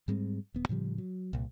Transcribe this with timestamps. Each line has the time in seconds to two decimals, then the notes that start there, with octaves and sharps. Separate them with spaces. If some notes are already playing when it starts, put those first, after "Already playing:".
0.08 G#2 G3 G#3 C4
0.54 D#1 B3
0.69 A2 C#3 F3 G3
0.98 F#3
1.33 C2 A#2